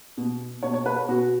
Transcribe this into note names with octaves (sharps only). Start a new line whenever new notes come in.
B2
B2 C#5
C#5
B4
B4
B2 F#4